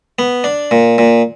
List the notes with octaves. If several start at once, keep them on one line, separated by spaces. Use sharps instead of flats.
B3
D4
A#2
A#2